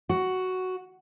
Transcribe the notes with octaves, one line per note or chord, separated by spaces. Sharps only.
F#4